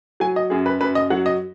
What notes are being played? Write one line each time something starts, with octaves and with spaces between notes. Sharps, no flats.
F#3 G#5
D#5
F#2 G#4
B4
F#2 B4
D#5
F#3 F#5
D#5